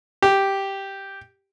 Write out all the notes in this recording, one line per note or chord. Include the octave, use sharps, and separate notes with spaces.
G4